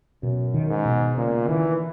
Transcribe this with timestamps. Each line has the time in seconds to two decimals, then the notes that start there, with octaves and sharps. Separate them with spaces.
0.22 F#2 B2
0.54 D#3
0.69 G#2
0.85 B2
1.17 A#2 C#3
1.48 D#3 E3